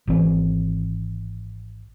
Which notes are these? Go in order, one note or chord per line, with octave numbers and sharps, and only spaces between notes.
G#1 E3 C4